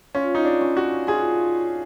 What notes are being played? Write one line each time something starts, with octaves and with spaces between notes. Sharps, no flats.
C#4 F4
D#4
D4
C#4
F#4
F4 G#4